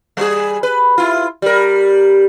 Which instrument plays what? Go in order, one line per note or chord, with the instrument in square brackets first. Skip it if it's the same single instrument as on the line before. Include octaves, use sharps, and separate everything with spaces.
[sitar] G3 G#4
B4
E4 F4
G3 A#4